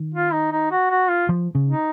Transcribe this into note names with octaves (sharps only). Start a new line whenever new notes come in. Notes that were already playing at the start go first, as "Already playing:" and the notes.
Already playing: D#3
F4
D#4
D#4
F#4
F#4
F4
F3
C#3
D#4